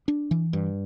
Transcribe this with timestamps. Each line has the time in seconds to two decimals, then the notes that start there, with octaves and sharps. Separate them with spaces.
0.08 D4
0.31 E3
0.53 G2